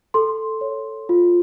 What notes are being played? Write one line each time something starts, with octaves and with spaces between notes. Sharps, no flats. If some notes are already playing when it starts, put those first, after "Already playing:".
A4 C6
C#5
F4